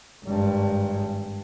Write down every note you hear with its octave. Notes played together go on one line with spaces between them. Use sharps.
G#1 G2